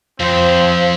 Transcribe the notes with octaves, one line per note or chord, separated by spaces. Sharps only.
F2 F3 C4